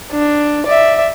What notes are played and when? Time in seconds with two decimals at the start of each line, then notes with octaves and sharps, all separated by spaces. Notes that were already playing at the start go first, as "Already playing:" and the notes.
0.12 D4
0.67 D5 E5